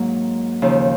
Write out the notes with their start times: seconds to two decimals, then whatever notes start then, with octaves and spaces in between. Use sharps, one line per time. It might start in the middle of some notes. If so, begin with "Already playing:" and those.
Already playing: G#2 F#3 A#3
0.62 D#2 C#3 F3